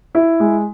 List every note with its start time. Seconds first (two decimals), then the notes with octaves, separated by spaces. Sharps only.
0.15 E4
0.40 G#3